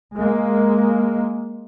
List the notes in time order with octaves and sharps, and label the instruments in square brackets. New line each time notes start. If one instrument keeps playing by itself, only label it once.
[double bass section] G#3 A#3